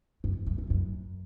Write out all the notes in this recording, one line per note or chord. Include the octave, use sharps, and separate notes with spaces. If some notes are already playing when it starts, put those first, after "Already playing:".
F#2
F#2
F2
F#2